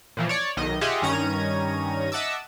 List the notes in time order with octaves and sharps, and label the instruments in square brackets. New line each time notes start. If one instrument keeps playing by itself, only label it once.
[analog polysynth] A#2 E3 F3
C#5 D5
B1 D#3 D#5
F4 G4 G#4 D#5 E5 F#5
G2 D#3 C#4 A#5 G#6 D#7
D#5 E5 F#5 A5 D6 E6